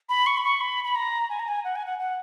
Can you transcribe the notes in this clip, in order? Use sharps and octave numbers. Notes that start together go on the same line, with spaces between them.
B5
C#6
B5
C#6
B5
B5
A#5
G#5
A#5
G#5
F#5
G#5
F#5
F#5